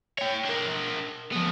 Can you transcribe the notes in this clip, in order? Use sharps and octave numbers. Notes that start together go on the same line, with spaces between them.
C#5 G5
D4 A#4
F3 B3